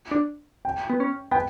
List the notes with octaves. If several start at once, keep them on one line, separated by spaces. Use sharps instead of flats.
D4
G5
B3
C#4
B3 G5